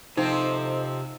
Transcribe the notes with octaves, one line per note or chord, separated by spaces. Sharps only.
C3 F3 C4 D#4 A4 C5 D#5